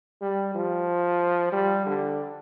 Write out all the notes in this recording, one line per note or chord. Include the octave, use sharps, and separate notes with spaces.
G3
F3
G3
D3